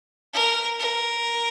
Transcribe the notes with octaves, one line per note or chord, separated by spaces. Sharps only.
A#4
A#4